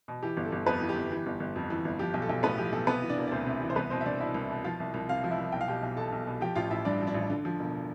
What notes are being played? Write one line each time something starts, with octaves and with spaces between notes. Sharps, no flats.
B2
E3 G4
G1
A4
G1
F2 B3 B4
E3
G4
G1
E3
G1
G1
F2
E3
G1
F3 G4
B1
A4
B1
A2 B3 B4
F3 G4
B1 A4
C3 B3 B4
E3
D4 D5
E1
D5
D2 C4 C5
C3
E3
C5
C2 B3 B4
B2 C4 C5
E5
C2 D4 D5
B2 E4 E5
C2
B2
F3 F4 F5
C2
C2
C3 F4 F5
F3
E4 E5
C2
B1 G5
F5
B2 G4 G5
B1
B2 A4 A5
B1
B2
F3 G4 G5
A1 F4 F5
A1 E4 E5
G2 D4 D5
F3
D4 D5
A1
D3
F3
E1